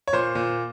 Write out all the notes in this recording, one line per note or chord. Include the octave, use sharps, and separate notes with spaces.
C#5
A#2 C5
A#2